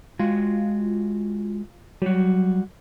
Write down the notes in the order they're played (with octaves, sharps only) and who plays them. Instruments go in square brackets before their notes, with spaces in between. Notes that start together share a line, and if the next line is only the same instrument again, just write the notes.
[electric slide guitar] G#3 F#4 [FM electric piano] F4
[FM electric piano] F#3 [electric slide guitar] G3 F#4